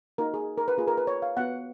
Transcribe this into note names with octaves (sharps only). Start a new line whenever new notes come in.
A#3 D#4 F#4 A#4
G#4
A#4
B4
A#3 F4 G#4
A#4
B4
C#5
F5
B3 F#4 F#5